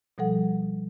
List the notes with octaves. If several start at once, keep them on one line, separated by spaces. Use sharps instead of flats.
B2 F3 G3 A4 F#5